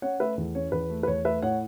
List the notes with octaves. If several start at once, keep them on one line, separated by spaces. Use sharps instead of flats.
C#4 C#5 F#5
A3 B4 E5
E2
C#4 C#5
E2 B4
A3
B4
E2 C#5
A3 B4 E5
A2 C#5 F#5